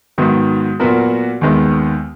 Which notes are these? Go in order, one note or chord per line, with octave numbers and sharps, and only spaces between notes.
G#2 D#3 F#3 B3
A#2 F#3 B3 F#4 A#4
D#2 D#3 G#3 B3